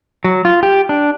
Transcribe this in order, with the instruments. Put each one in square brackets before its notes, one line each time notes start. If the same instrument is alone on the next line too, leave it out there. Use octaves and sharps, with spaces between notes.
[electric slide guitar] F#3
F4
G4
D4